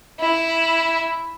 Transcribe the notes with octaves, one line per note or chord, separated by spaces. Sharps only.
E4